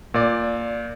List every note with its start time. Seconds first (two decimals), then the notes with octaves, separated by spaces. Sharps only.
0.14 A#2 D5